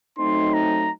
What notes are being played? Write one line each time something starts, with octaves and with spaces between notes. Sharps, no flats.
F#3 A3 C4 D#4 C6
A#5